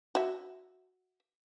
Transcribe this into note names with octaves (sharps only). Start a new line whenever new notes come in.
F#4 E5